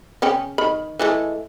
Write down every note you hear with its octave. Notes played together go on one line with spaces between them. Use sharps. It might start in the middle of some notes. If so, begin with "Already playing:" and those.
C#3 C#4 G5
D#3 B5
E3 G#3 A3